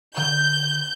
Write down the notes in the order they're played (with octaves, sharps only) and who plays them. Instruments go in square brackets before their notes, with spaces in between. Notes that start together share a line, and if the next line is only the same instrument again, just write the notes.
[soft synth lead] D3 [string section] G6